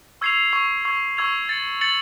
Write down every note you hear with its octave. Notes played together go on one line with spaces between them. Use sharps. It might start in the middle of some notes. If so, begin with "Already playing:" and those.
C#6 E6 G#6 C7 F7
C#6 E6 G#6 C7 F7
C#6 E6 G#6 C7 F7
C#6 E6 G#6 C7 F7
A6 C#7 F#7
A6 C#7 F#7